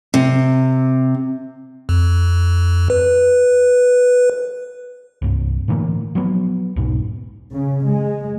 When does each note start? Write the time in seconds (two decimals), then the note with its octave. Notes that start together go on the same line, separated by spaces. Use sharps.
0.14 C3
1.89 F2
2.90 B4
5.22 C2 G2
5.68 A2 D3 E3 A#3
6.15 F3 F#3 B3
6.76 B1 E2 G#2 B2
7.52 C#3
7.86 G#3